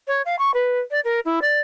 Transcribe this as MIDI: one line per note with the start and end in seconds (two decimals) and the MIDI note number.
0.08 0.22 73
0.26 0.39 77
0.39 0.51 85
0.54 0.80 71
0.91 1.00 74
1.05 1.20 70
1.25 1.40 64
1.42 1.61 74